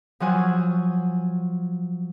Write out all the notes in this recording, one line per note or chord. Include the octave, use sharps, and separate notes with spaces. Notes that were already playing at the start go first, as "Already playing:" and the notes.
F3 F#3 F#5 G#5